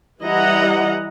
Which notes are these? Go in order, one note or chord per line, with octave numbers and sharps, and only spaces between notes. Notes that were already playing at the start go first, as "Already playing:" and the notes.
E3 G3 E4 D#5 F#5 A#5